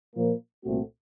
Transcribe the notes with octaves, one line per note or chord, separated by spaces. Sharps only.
A#2 F3 A#3
C2 A#2 A3 C4 F#4